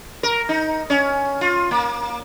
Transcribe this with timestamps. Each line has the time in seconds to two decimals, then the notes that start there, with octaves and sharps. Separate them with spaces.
0.23 A#4
0.49 D#4
0.90 C#4
1.41 F4
1.71 A#3